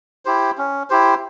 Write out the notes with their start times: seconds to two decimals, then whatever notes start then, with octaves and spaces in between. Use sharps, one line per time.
0.25 E4 G4 C5
0.58 C#4
0.90 E4 G4 C5